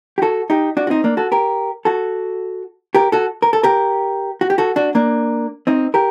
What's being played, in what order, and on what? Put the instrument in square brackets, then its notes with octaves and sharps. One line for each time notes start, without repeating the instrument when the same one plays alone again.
[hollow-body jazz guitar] G4
F#4 A4
D#4 G4
D4 F#4
F#4
C4 D#4
A#3 D4
F#4 A4
G4 A#4
F#4 A4
G4 A#4
F#4 A4
A#4
A4
G4 A#4
F#4
G4
F#4 A4
D4 F#4
A#3 D4
C4 D#4
G4 A#4